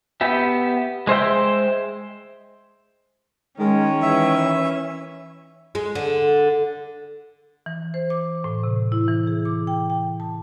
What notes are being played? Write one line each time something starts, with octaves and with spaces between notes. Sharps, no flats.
B3 G4 E5
G#3 C5 E5 G5
D#3 G#3 C#4
E3 E5
G#3
D3
E3
C5
D6
A2
C3
E4
E3
G#4
D6
G5
G5
A5